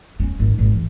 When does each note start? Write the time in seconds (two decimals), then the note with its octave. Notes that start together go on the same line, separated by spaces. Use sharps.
0.20 C#4
0.39 G#1
0.58 G#1
0.71 E3